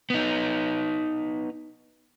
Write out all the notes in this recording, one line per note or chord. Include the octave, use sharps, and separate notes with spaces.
B3 D#4